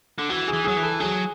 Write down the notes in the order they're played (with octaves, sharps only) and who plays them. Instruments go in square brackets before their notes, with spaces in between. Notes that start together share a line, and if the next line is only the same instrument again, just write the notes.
[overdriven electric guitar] D3
[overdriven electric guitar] E3 [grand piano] F#4
[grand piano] G#4
[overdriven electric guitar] E3
[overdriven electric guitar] F#3 [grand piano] G#4
[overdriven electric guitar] E3
[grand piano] A4
[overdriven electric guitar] F#3 [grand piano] G#4